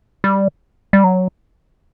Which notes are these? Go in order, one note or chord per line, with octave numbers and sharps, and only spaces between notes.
G3
G3
F#3